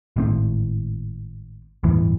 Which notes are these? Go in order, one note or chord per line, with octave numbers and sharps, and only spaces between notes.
G#1 A2 C4
G1 E2 A2 E3